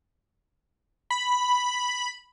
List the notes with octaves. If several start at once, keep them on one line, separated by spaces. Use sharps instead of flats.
B5